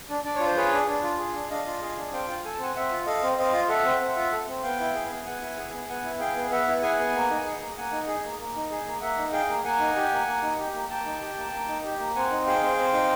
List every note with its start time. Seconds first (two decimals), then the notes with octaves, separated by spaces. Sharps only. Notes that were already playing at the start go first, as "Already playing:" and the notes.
0.10 D4
0.24 D4 D5
0.35 F4 C#5
0.46 C5
0.56 G#4 B4 C#5
0.72 D4
0.87 D4
1.03 F4
1.19 G#4
1.34 D4
1.50 D4 D#5 F5
1.66 F4
1.81 G#4
1.97 D4
2.12 C4 F5 G5
2.28 F4
2.45 A4 G#5
2.54 A5
2.59 C4 F#5 G#5
2.75 C4 E5 F#5
2.91 F4
3.06 A4 D#5 F5
3.22 C4
3.38 C4 D#5 F5
3.53 F4
3.69 A4 E5 F#5
3.84 C4
4.00 C4
4.16 F4
4.32 A4
4.47 C4
4.63 B3 F5 G5
4.80 E4
4.95 G#4
5.11 B3
5.26 B3 F#5 G#5
5.41 E4
5.57 G#4
5.73 B3
5.89 B3 F#5 G#5
6.04 E4
6.20 G#4 F5 G5
6.36 B3
6.51 B3 E5 F#5
6.67 E4
6.82 G#4 F#5 G#5
6.99 B3
7.15 A#3
7.30 D#4
7.45 G#4
7.61 A#3
7.77 A#3 F#5 G#5
7.92 D#4
8.07 G#4
8.24 A#3
8.39 A#3
8.56 D#4
8.71 G#4
8.86 A#3
9.01 A#3 E5 F#5
9.18 D#4
9.33 G#4 F5 G5
9.49 A#3
9.64 A#3 F#5 G#5
9.80 D#4
9.95 G4
10.12 A#3
10.27 A#3
10.42 D#4
10.59 G4
10.74 A#3
10.89 A#3 G5 A5
11.05 D#4
11.21 G4
11.37 A#3
11.53 A#3
11.68 D#4
11.84 G4
11.99 A#3
12.15 C4 F#5 G#5
12.30 D#4
12.46 G#4 F5 G5
12.62 C4
12.77 C4
12.93 D#4